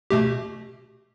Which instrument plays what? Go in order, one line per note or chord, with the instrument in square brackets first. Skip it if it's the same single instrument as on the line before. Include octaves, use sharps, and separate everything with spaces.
[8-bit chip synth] B2 A3 G4